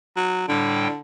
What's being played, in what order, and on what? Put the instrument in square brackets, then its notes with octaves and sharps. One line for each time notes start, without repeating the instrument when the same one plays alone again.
[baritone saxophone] F#3
[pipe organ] A2 G3 G5 [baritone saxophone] D3